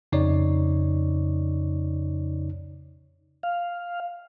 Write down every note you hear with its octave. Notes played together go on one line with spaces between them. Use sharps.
F2 C#3 D#4 C#5 D5
F5